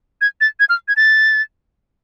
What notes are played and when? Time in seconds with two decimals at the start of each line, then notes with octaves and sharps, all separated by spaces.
0.21 G#6
0.41 A6
0.60 G#6
0.69 F6
0.88 G#6
0.97 A6